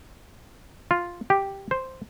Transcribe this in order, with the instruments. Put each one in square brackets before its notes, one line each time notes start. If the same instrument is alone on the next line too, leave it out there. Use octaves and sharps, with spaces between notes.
[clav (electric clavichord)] F4
G4
C5